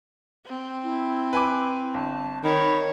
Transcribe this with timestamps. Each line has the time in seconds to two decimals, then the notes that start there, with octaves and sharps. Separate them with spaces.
0.46 C4
0.83 E4
1.33 B4 G#5 D6
1.94 G1 A5
2.44 D#3 C#5 B5